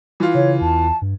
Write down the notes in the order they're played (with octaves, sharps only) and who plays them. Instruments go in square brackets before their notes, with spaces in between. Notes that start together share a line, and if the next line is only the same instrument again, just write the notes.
[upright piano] E3 F4
[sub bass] C#3 [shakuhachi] C#5
[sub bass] E2 [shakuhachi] A5
[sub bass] G2